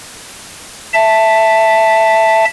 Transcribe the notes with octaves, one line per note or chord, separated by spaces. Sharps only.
E5 A5